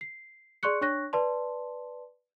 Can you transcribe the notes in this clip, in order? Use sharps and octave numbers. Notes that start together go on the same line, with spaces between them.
C7
G#4 D5 C6 C#6 F#6 C#7
D4 C#5 C#6 F#6 A#6
B4 D5 A5 C6